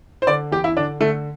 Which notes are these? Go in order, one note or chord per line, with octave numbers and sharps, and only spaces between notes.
C5
D3 D5
E2 G4
E4
D3 D4
D3 A3